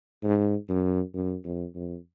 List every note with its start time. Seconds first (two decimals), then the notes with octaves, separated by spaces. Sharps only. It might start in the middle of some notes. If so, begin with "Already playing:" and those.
0.23 G#2
0.69 F#2
1.14 F#2
1.45 F2
1.75 F2